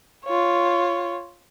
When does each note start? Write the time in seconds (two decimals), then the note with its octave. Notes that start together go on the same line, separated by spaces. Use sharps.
0.25 F4 C#5